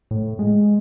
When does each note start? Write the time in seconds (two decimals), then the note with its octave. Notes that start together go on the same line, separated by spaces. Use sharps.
0.11 A2
0.39 G#3